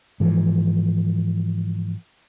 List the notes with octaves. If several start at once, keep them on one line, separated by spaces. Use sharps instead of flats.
G#2 E3 F3